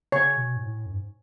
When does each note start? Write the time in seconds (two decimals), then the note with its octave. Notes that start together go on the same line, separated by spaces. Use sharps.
0.12 C#3 C#5
0.37 B2
0.56 G#2
0.61 A2
0.86 F#2
0.93 G#2